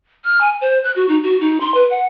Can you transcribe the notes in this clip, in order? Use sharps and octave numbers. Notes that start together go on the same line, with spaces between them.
F6
G#5
C5
F#6
F#4
D#4
F#4
D#4
C6
B4
F#5